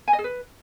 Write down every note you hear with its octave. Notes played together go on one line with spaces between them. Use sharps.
G#5
D#5
G#4
B4